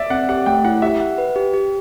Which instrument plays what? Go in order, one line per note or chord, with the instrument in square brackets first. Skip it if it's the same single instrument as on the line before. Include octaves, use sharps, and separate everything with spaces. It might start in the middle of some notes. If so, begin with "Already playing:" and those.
Already playing: [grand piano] D5 E5
[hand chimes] C4 [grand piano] F#5
[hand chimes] G4 [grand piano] F#5
[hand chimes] A3 [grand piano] G5
[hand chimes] E4 [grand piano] F#5
[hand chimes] G4 [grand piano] E5
[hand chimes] F#5
B4
G4
G4